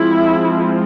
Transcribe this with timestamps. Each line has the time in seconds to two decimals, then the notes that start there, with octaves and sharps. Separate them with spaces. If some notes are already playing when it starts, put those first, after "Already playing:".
Already playing: F3 G#3 C4 E4